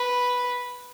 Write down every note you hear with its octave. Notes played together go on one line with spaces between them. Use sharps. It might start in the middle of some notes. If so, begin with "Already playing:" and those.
Already playing: B4